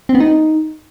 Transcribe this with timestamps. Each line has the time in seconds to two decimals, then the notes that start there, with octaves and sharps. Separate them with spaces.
0.09 C4
0.15 B3
0.20 D#4